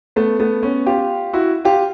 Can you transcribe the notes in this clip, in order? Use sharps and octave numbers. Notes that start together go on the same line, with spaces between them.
A3 B3
A3 B3
B3 C#4
F4 G4
E4 F#4
F4 G4